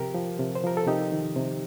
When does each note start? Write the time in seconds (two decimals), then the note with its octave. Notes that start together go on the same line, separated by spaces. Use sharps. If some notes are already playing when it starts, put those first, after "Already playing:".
Already playing: C3 F3 G4 A#4
0.14 F3
0.39 C3
0.55 C5
0.64 F3 A#4
0.77 A4
0.87 C3 D#4 G4
1.12 D#3
1.36 C3